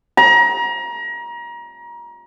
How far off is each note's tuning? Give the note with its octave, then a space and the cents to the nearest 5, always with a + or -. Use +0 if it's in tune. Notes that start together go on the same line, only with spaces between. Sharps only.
A#5 +30